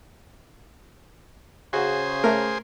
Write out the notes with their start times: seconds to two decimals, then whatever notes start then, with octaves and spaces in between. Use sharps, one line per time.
1.73 C#3 F#4 G#4 C5
2.24 A3 A#4